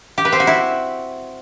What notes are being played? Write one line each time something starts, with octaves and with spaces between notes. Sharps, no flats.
G4
B4
C4
F#4
E4